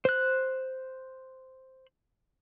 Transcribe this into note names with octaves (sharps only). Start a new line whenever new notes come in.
C5 F#6